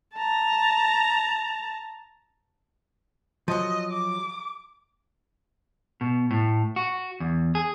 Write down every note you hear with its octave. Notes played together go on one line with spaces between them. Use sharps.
A5 A#5
F3 F#3 D#5
D6
B2
A2
F#4
E2
G#4